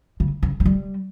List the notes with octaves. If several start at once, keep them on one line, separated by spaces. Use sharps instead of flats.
C#3
C#3
F#3
G3